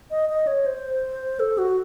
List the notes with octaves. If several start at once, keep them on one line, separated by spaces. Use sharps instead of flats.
D#5
D#5
C#5
C5
A4
F#4